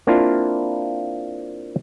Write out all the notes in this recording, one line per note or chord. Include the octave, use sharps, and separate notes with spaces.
A#3 C4 D4 E4 F4 F5